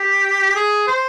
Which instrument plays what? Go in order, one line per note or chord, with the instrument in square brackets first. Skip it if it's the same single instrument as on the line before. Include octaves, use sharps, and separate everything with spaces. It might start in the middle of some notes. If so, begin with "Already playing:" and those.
Already playing: [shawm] G4
G#4
C5